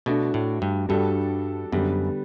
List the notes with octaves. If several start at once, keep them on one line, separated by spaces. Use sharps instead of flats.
B2 A3 D4 F#4
A2
G2
G2 G3 D4 F#4 A4
F#2 D3 G3 B3